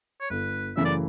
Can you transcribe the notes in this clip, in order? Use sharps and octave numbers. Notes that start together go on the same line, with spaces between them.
C#5
G1 B4
F#2 C#3 E3 A3 E5
D5